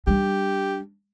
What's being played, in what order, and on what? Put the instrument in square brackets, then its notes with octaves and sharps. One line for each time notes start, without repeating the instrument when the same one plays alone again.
[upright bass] G3 D4 [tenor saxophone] G4